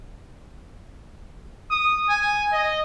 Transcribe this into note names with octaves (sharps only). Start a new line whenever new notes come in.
D#6
G#5
D#5